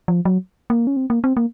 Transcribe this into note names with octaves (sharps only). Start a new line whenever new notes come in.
F3
F#3
A#3
C#4
C4
A#3
C4
A#3